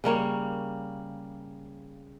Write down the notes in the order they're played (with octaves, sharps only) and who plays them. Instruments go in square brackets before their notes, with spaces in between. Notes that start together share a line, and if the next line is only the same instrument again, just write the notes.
[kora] C#3 G3 A#3 C#5